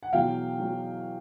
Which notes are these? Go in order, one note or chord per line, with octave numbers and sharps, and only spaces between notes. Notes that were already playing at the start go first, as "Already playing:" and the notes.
F#5
E2 B2 F#3 F5 G5
F#3